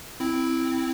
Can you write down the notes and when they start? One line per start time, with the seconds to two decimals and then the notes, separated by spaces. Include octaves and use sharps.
0.20 C4 E4